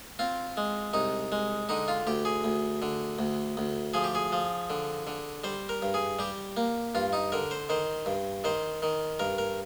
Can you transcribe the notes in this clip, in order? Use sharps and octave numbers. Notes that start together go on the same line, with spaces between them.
C4 F4
G#3
C2 D#4
G#3
D3 D#4
F4
D2 G4
G#4
D2
D3
D2
D2
F3 G#4
G4
G#4
F3
D3
D3
G3 C5
A#4
G2
G#4
G3 G4
A#3
G2 F4
D#4
D3 A#4
C5
D#3 C5
G2
D#3 C5
D#3
G2 A#4
A#4